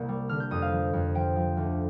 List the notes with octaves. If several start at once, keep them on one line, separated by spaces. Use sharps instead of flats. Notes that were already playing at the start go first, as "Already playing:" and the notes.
Already playing: C2 A#3 G6
G3
D3 F6
G6
F2 D#6
F5
F3
F2
F3 G5
F3
D2